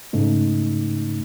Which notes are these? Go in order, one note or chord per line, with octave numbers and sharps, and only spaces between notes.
G#2 C#3 A3 D#4